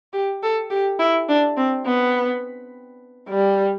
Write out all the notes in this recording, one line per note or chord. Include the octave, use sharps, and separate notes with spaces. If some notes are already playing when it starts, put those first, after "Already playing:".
G4
A4
G4
E4
D4
C4
B3
G3